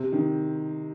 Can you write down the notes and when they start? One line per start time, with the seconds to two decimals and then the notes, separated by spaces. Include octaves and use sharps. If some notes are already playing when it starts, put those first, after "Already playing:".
Already playing: C3
0.12 D#3